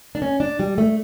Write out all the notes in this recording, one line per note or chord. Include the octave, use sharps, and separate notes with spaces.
D4
C#4
D4
G3
A3